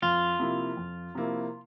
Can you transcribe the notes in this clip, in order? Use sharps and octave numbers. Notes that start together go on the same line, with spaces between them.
F2 F4
C3 F3 A#3 E4
F2
C3 F3 A#3 E4